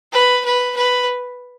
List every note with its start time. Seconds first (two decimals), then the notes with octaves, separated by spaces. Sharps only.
0.12 B4
0.45 B4
0.76 B4